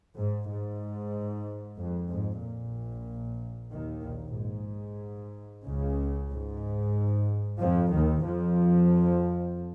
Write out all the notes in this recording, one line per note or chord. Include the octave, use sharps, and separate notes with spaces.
G#2
G#2
F2
G#2
A#1 A#2
D#2 D#3
A#1 A#2
G#2
C#2 C#3
G#2
F2 F3
D#2 D#3
F2 F3